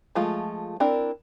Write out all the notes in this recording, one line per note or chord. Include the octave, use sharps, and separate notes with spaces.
F3 G#3 A3 F4
C4 D4 E4 A#4